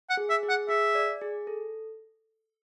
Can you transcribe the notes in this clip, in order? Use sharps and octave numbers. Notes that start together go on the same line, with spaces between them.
F#5
G#4
E5
G#4
F#5
G#4 E5
D5
G#4
A4